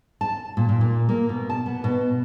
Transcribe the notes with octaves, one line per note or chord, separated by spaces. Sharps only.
A5
A#2
A#2
A#2
A#3
B2
A5
B3
B2